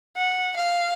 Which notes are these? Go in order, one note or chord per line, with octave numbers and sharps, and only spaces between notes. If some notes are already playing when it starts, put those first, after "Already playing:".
F#5
F5